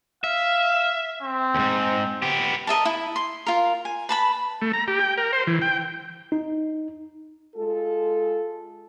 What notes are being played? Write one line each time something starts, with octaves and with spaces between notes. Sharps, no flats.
E5 F5
C4
D#2 G#2
B3 G4
A#4 D#5 E5 A5
E4
C6
F4 A#4
G#5
B4 A5 B5
A3
A#5
G4
G5
A#4
C5
E3
G5
D#4
G#3 F4 A4